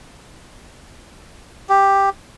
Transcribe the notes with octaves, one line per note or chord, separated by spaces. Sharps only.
G4